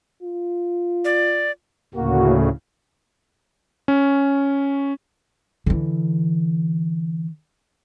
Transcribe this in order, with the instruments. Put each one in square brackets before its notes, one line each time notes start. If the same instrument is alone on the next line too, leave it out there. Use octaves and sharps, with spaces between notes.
[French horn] F4
[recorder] D5
[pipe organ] D2 A2 C#3 [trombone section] A#3 F#4
[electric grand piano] C#4
[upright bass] D3 E3